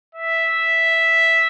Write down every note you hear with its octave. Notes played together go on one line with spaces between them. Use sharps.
E5